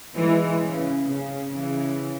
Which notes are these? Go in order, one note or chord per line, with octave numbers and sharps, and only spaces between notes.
E3 G#3
C#3
C#3
C#3 E3